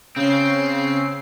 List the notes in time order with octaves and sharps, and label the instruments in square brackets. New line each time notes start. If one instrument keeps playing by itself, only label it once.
[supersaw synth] C#3 C7 [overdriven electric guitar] C4